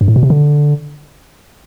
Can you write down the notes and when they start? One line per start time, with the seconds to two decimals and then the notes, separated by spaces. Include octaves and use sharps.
0.01 G2
0.08 A2
0.16 B2
0.23 C3
0.30 D3